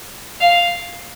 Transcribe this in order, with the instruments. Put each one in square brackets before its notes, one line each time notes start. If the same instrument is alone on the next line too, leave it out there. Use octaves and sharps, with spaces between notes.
[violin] F5